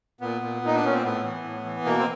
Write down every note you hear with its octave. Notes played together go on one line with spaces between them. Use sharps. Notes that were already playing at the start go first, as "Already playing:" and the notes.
A#2 B3
A#2
A#2 D#4
D4
A#2 C#4
C4
A2 B3
E3
A2
E3
B2 A#3
C4